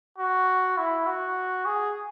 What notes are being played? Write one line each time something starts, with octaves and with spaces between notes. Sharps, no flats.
F#4
E4
F#4
G#4